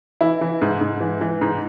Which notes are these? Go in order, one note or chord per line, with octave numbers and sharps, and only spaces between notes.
E3 E4
E3
G#2
G#2
E3
E3
G#2